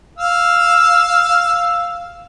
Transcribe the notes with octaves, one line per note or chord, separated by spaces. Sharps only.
F5 E6